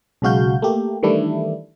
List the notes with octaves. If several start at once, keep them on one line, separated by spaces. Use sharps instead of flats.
B1 C#3 G#3 F#4 F5 G6
A3 A#3 G4
D#3 E3 G3 A3 D4 E4